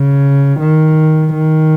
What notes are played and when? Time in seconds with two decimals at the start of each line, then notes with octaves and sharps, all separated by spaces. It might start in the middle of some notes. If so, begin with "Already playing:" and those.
Already playing: C#3
0.60 D#3
1.33 D#3